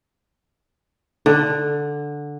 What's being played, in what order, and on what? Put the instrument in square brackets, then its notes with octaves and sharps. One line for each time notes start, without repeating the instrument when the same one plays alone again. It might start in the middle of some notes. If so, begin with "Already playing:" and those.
[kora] D3